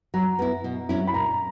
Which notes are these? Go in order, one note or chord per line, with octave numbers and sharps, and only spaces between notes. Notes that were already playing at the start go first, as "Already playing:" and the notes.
F#3 A#5
B3 E4
B2
F#3 C#4 E4
B5
A#2 A#5